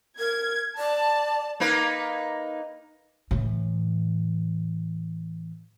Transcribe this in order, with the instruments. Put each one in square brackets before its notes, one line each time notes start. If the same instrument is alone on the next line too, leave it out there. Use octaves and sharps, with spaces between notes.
[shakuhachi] A#4 [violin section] G#6
[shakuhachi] D5 [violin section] A5
[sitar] A#3 D#4 B4
[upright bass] A2 E3